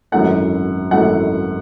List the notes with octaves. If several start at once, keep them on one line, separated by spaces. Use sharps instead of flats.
G#1 F#2 E3 A3 F#5
G#1 F#2 E3 A3 F#5